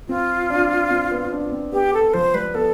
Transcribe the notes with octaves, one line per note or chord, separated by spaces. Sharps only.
C4 F4
D4
C4
B3
D4
C4
B3 G4
A4
F3 C5
G3 B4
B3 A4